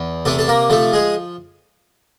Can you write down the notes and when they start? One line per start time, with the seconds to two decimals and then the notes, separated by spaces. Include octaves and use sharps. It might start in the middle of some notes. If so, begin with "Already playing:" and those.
Already playing: E2
0.25 C3 A3 A4
0.39 A4
0.48 A#3 A#4
0.70 F3 A3 A4
0.93 G#3 G#4